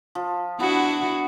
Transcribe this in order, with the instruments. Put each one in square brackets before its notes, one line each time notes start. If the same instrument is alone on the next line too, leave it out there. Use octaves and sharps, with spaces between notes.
[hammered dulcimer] F3
[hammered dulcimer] B3 [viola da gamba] D4 E4 F#4